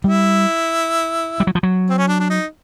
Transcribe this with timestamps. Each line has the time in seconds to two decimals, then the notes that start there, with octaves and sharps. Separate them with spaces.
0.04 G3 E4
1.40 G3
1.47 F#3
1.55 F3
1.63 F#3
1.90 C4
1.98 C#4
2.08 D4
2.20 D4
2.30 D#4